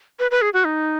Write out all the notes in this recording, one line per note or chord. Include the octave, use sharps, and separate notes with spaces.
B4
B4
G#4
F#4
D#4